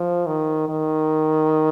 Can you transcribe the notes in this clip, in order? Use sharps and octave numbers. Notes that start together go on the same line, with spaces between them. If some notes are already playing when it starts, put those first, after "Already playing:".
Already playing: F3
D#3
D#3